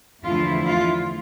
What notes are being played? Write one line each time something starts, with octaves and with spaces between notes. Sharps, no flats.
E2 D3 F3 A3 E4 F4
F4